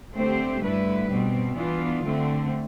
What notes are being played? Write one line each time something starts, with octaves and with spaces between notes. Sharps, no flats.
D3 A3 C4 G4 C5
G2 D3 A3 E4 B4
B2 G3 C4
E3 B3 D4 F4
D3 A3 C4